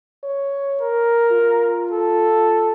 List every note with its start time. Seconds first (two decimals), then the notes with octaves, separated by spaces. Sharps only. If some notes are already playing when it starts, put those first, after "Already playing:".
0.24 C#5
0.81 A#4
1.32 F4
1.91 A4